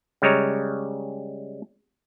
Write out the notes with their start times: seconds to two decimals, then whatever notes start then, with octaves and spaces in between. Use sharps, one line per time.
0.22 C#3 G3 G#3 C#5 A#5